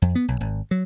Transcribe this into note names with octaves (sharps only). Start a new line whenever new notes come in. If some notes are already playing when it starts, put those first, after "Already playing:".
F2
B3
B1
G#1
F#3